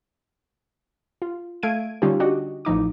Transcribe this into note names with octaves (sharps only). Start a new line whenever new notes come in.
F4
A3 F5 G#6 D7 D#7
D3 G3 C#4 D#4 F4 G4
D4 F#4 G4 D#5
A1 F3 D#4 D6